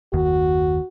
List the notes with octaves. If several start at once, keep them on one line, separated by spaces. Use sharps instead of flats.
F#1 D#2 D#3 F#4